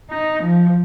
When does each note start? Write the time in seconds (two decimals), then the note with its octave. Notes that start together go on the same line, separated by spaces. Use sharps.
0.11 D#4
0.43 F3